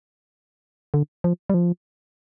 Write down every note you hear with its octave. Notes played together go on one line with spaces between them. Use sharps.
D3
F3
G3
F3